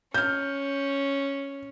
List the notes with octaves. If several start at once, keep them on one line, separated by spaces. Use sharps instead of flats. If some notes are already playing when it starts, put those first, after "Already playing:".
C#4 F6 G6